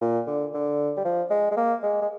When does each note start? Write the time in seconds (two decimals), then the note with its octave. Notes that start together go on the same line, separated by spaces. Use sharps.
0.01 A#2
0.27 D3
0.54 D3
0.97 G3
1.05 F3
1.30 G#3
1.51 G#3
1.57 A#3
1.83 G#3
2.02 G#3